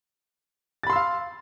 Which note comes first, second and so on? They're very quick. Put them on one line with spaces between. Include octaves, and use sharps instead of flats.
A6 B5 C6 E6 F5